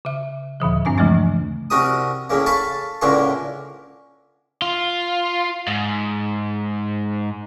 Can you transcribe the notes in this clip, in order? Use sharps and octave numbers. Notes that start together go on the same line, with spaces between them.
C#3 E5
D#2 A#2 D3 F3
G2 C4 D4 G#5 D6
C#3 E3 F3 G#3 A3 D4
C2 F#4 A#4 D#6
A2 C#3 A#3
A4 F5 A5 B5 C#6
C#2 A2 D3 A#3 C6 C#6
F4
G#2